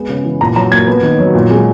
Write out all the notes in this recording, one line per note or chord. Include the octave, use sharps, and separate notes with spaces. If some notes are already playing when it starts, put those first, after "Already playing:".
Already playing: G#3 B3
C#3
E3
A#2 A#5
F#3 A#5
A#3 G#6
B3
D#3
F#3
A#2
G#3